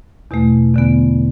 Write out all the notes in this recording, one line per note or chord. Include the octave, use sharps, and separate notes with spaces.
E2 B2 A3
E2 D3 B3